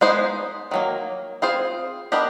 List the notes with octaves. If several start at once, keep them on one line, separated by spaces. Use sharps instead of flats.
G#3 B3 D#4 G#4 C5
D#3 F#3 A#3
C4 F4 G#4 C5
B3 D4 G4 A#4 D#5